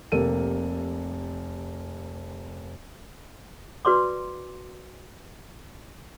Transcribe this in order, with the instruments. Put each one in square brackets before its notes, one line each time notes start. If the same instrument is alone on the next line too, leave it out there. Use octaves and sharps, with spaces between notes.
[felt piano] F1 C3 A#3 A4 D#7
[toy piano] F#4 B4 D5 C6 D6